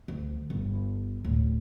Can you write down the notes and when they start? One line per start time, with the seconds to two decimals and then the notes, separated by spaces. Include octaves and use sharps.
0.08 D2
0.50 G1
1.25 D1